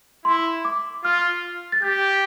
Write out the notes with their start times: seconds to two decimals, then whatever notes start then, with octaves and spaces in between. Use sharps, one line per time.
0.25 E4 C6
0.65 D6
1.04 F4 F6
1.72 A6
1.82 G4 G6